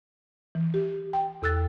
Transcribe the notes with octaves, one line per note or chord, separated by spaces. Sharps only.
E3
G4
G5
E2 A4 E6 F#6 A6